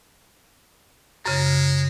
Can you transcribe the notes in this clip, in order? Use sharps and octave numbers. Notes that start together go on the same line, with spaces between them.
F#2 C#3 G#3